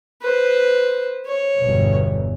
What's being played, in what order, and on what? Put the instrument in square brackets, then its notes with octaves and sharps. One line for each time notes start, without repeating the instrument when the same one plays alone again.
[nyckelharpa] B4 C5
C#5
[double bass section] G1 E2 B2